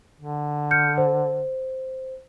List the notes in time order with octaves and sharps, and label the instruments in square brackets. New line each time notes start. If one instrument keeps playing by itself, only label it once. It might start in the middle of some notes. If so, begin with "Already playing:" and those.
[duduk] D3
[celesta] F6 G6 C#7
C5